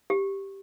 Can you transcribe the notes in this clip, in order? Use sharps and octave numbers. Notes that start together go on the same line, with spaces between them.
G4